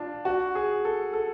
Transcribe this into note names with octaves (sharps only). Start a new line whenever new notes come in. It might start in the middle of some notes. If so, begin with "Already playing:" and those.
Already playing: D4 F4
F#4
G#4
A4
A4